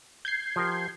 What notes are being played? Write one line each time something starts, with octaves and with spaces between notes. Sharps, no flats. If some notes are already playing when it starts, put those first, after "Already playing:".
G6 G#6 C7
F3 G4 A#4